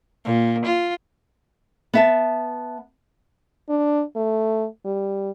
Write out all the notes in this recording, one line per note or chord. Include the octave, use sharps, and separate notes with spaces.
A#2
F4
B3 E5 A5
D4
A3
G3